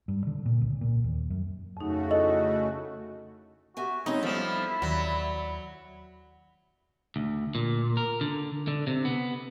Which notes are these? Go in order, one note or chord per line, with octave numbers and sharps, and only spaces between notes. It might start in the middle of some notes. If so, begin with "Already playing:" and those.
G2
D3
A#2
C#2
A#2
D#2
F#2
F2 C#3 A3 D#4 F#4
D#4 E4 A4 D#5
F#4 G4 E5 G#5
G#3 C4 C#4 D#4 E4
F3 G3 B3 A4
D#2 F#3 D5
D2
A#2
A#4
D3
D3
C3
B3